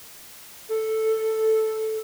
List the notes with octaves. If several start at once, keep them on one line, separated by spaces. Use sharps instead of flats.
A4